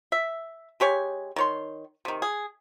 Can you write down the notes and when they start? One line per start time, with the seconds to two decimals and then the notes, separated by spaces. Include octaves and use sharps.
0.12 E5
0.80 G#3 G4 C#5 G#5
1.36 D#3 C#5 C6
2.05 C3 D#3
2.22 G#4